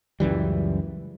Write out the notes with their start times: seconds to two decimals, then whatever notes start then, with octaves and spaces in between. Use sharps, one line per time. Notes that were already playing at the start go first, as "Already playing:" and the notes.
0.20 C#2 F#2 E3 G3